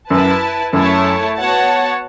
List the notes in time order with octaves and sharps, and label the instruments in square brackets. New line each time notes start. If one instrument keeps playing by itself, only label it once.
[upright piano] F#2 [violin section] E4 B4 A5
[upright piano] F#2 [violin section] A3 E4 C#5 A5
[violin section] B3 F#4 C#5 F#5 A5